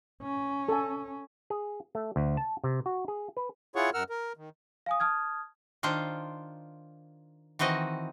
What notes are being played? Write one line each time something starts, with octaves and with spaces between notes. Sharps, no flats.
C#4
A4 G#5
G#4
A3
D2
A5
C3
F#4
G#4
B4
E4 F4 G#4 C#5 F#5 C#6
F#2 A#4 F#5 E6 F6
A#4
D#3
F5 G#5 D#6
A5 D#6 F6 G#6
D#3 D4 F4 C5
D#3 E3 C4 F#4 D#5